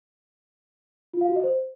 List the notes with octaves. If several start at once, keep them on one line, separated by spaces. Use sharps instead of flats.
F4
F5
F#4
D#5
C5